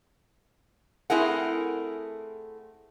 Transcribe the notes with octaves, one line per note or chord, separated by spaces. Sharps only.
A3 C4 E4 G#4 A#4 F#5